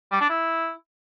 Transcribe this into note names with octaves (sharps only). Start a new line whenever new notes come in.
G3
D4
E4